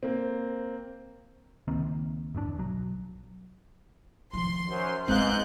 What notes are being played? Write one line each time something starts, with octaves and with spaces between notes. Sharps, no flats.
A#3 C4
C#2 D#3 A#3 C4
G1 E2 D3 D4
B1 F#3
D#3 F3 C6
F#2 C5
G#2 G#3 B3 C4 B4 F5 F#6 G6